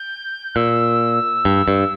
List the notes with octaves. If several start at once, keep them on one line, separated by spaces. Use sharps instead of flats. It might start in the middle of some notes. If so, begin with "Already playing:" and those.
Already playing: G6
A#2 E6
G2
G2